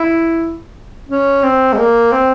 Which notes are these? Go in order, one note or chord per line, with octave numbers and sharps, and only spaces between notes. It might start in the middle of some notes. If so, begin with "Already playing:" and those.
Already playing: E4
C#4
C4
G#3
A#3
C4